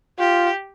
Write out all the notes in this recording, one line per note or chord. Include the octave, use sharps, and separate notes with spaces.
F4 G4